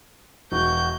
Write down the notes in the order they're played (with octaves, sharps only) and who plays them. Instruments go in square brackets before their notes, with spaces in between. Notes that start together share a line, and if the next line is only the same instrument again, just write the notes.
[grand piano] E1 [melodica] F#4 [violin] G6